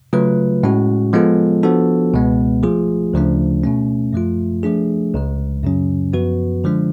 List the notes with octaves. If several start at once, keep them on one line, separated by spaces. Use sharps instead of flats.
C#3 F#3 A3 F4 B4
A2 G#3 C#4 F#4
F3 G#3 B3 F4 A4
F3 B3 D4 F#4 A4
C#2 B2 G#3 B3
F3 A3 F4 G#4
D2 C#3 F3 A3 D4
B2 A3 C#4
F#2 F3 A3 F4
F3 A3 D4 G#4
C#2 C#3 G#3
F#2 C#3 F#3 C#4
F#2 F3 B3 F#4 B4
D3 F3 G#3 D4